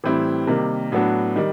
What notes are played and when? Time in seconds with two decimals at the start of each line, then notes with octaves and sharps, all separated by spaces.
0.04 A2 E3 G3 C4 E4
0.47 C3 D#3 G3 A#3
0.92 A2 F#3 B3 D4 F#4
1.36 D#3 G3